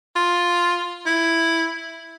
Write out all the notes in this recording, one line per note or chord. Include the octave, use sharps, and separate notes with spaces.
F4
E4